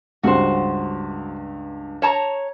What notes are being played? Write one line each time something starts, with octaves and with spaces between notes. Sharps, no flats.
C#2 G2 F#4 C5
C#5 A5 A#5